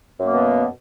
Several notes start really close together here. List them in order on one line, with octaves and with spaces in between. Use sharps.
F#2 A#3 B3 B2